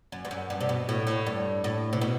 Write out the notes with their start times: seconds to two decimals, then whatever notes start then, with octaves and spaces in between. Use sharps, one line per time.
0.12 F#2
0.25 G2
0.31 F#2
0.50 G2
0.60 C3
0.69 B2
0.89 A2
1.07 A2
1.26 G2
1.64 A2
1.93 C3
2.01 B2